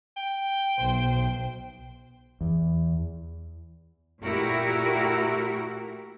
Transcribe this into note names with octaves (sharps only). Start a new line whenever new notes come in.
G5
B1 C5
E2
A#2 A3 E4 F#4 G4 A#4